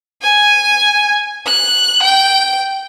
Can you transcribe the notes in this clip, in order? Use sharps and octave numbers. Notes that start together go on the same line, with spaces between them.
G#5
F#6
G5